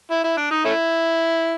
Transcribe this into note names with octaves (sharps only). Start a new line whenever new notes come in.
E4
E4
D4
D#4
A3 C#4 E4